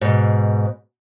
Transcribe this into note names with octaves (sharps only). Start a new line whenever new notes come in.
G#2 B2